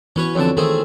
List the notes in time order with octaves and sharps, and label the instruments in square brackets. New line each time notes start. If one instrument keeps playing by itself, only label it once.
[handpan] E3 B3 F#4 [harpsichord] C#4 B4 C#5
[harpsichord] F2 D3 A5 [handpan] C#5
[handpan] D#3 A#4 [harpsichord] A3 C4 G#4